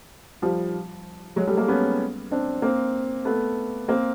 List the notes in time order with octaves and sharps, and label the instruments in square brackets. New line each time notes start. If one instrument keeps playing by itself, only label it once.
[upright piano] F3 G3
F#3 G#3
G3 A3
G#3 A#3
B3 C#4
C4 D4
A#3 C4
A3 B3
A#3 C4